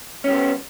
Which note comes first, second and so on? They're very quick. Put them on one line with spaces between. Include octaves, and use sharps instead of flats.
C#4 G3 B3